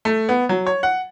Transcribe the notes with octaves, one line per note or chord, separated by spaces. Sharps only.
A3
B3
F#3
C#5
F#5